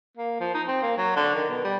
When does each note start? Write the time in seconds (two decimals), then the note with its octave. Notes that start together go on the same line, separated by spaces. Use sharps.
0.17 A#3
0.40 F3
0.54 D#4
0.67 C4
0.82 A#3
0.97 F#3
1.16 D3
1.35 D#3
1.49 B2
1.64 G3